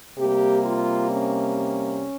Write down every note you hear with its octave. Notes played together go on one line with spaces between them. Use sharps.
C3 G3 A#3 G4
F4
C#4